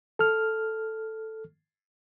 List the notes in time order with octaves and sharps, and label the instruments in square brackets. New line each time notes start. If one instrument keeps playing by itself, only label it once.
[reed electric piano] A4 F6